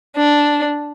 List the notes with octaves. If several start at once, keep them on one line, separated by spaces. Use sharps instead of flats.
D4